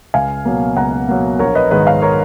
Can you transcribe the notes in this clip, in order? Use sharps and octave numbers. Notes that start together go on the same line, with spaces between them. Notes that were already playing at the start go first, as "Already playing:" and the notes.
C#2 F5 G#5
B2 F#3 A#3
C#2 F#5 A#5
B2 F#3 A#3
A#1 A#4 C#5
B4 D#5
G#2 D#3 G#3 B4 D#5
C#5 F5
A#4 C#5